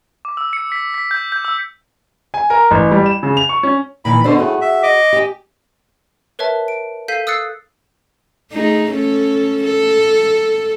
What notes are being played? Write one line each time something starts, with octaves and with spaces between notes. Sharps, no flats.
D6
E6
C#7
B6
B6
G6
G6
E6
G#5
A#4
A1
G3
E7
C#3
F7
C#6
C#4
A#2 D#3 E3 B5
B2 D3 D4 A4 C5
A2 A3 F#4 G#4
E5
D#5 D6
G4 G#5
A#4 B4 C#5 E5 A5
D7
A4 F5 G6 B6 D#7
D#6 E6 F#6 A6 C7 C#7
A3 D#4 G#4
C#4 A4
A4